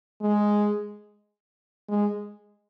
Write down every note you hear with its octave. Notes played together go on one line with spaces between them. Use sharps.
G#3
G#3